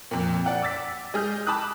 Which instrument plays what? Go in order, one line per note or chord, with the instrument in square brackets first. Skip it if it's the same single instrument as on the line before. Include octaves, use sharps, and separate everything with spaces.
[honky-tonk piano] F2 A#2
D5 F#5 G5
D6 E6 A6 B6
G#3 G#4 F6 G6
A5 B5 D6 D#6 F#6